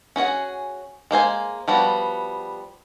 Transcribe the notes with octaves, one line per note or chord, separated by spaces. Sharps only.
C#4 F#4 G#4 F#5
G#3 A#3 C5 G#5
F3 G3 B3 F#4